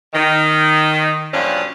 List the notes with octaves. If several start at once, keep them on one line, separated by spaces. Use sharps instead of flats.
D#3
G2 A#2 F3 F#3 C#4 D4